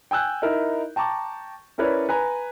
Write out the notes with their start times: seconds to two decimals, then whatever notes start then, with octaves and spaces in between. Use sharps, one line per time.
0.11 G5 G#5 E6 F#6 G6
0.42 D#4 E4 A#4 E5
0.96 G5 A5 A#5 C#6 D6
1.78 C#4 E4 A#4 B4 C#5 D5
2.09 B4 G#5 A#5